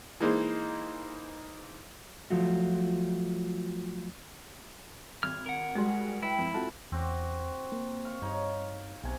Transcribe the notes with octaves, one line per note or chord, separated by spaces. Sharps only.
E3 G#3 A#3 D#4 G#4 C5
F3 F#3 A3 F4 F#4
G#1 F6 G#6
A#4 F#5
G3 G#3 F#4 G#4 C6
E4 B4 G5
F2 B4
C4 F4 F#4 A4 A5
E2 C4 F#4 D6
A#3
F5 C#6
G2 D#4 C#5
B1 C3 G#5